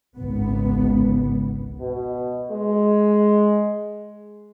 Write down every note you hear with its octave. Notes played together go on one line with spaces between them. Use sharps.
G#1 C#2 B3
B2
G#3